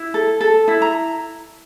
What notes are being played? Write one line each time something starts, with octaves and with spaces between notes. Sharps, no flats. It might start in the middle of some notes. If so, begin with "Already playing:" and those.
Already playing: E4
A4
A4
E4
A#5